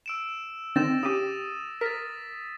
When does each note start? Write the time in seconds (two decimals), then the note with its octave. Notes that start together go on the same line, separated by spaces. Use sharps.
0.06 E6 D7 E7
0.76 D3 D#3 C4 A6 A#6 E7
1.03 C#3 G4 D#6 D#7
1.81 A#4 A6 B6